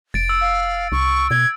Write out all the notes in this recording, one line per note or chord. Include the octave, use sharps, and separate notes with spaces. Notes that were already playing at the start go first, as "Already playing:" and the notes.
F1 A6 D7
E6
F5
C2 C#6
B2 G#6